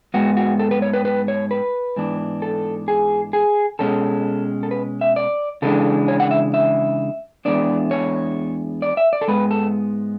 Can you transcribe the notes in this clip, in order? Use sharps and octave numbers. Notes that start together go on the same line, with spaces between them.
G#2 G#3 B3 F#4
F#4
A4
B4
C#5
B4
B4
C#5
B4
G#2 E3 B3 D4
A4
G#4
G#4
B2 G#3 C#4 A4
A4
B4
E5
D5
C#3 E3 G#3 D4 A4
C#5
F#5
E5
E5
E2 C#3 G#3 B3 D4 D5
C#5
D5
E5
D5
A4
G#2 G#3 B3 B4
A4